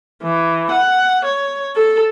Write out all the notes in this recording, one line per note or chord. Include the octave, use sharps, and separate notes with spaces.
E3
F#5
C#5
A4